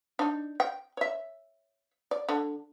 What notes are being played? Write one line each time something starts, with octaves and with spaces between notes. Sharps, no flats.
D4 D#4
G5
C#5 E5
D5
D3